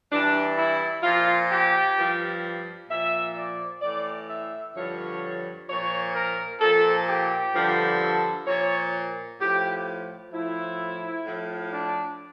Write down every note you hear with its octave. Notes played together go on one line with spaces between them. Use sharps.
G2 E3 D4
E4
A#2 F3 F4
G4
G2 F3
A#2 F3 E5
D5
A2 E3 D5
E5
G2 D3 F3 C#5
A#2 F3 C#5
A#4
A#2 F3 A4
G4
G2 D3 F3
A4
A#2 F3 C#5
A2 F3 G4
A2 F3 E4
A2 F3
D4